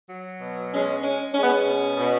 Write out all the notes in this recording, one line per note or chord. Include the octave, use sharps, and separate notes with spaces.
F#3
B2
G#3 C#4
G#3 C#4
G#3 C#4
B3
C#4
B2
B2